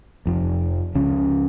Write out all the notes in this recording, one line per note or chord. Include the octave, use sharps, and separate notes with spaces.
F1 F2 F3
C#2 C#3 F3 C#4